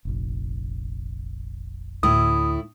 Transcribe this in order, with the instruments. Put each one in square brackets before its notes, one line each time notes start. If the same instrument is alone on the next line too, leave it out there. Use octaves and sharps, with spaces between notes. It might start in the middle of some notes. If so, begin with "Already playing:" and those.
[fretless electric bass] F1 A#1
[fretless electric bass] D2 [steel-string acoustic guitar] A2 E4 [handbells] D#6